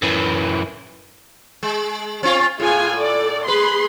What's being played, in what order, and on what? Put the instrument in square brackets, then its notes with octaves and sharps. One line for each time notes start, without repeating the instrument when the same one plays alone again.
[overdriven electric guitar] F#2 E3
[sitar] G#3
C4 C#4 F4
[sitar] A2 [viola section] F4 G#4 G#5
[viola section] A4 D5
[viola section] G#4 B5 C6 [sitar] B4